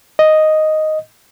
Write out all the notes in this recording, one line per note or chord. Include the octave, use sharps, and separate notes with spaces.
D#5